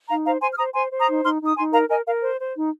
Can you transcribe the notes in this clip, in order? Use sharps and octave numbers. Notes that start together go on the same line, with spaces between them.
D#4 F5 A#5
C5 F5 A#5
C5 G#5 C6
F6
C5 A#5 D#6
C5 G#5 C6
C5
A#5 D#6
D#4
D#4 C6 F6
D#4 D#6
D#4 G#5 C6
A#4 F5 A#5
A#4 D#5 G#5
A#4 F5
C5
C5
D#4